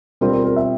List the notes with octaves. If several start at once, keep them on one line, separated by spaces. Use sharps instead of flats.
B2 G3 C4 F4 A#4
A#4
A#4
E5